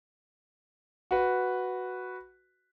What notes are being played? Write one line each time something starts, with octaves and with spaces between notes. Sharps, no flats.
F#4 B4